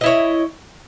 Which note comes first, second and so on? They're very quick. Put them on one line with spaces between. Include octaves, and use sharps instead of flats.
D#5 E4 C#5